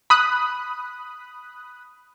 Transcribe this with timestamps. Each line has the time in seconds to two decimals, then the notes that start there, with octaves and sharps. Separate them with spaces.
0.10 B5 D#6 F#6